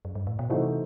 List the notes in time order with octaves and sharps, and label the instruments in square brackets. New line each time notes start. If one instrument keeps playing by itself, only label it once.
[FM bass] F#2
G2
A2
B2
[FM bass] C3 [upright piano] E3 A3 D#4 F#4 C5